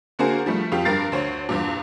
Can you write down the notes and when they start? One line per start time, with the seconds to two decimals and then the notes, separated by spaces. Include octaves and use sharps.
0.19 D3 A#3 F#4 G#4 A#4 C5
0.46 F3 G3 A3
0.72 F2 F4 G4
0.85 G2 A#4 A6 C7
1.12 D2 C5 C#5
1.49 E2 G2 A#2